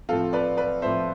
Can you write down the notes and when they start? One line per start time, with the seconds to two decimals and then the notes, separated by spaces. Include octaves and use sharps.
0.09 A2 F3 C4 F4 A4
0.33 B4 D5
0.57 B4 D5
0.82 A2 F3 C4 C5 E5